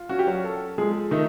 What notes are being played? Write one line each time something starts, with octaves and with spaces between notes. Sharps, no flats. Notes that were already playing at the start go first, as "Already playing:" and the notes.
Already playing: F4
C#4 F#4
G4
F#3 F#4
A4
F3 G#3 G#4
D#3 A3 D#4